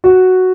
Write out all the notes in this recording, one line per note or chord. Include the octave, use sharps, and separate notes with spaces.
F#4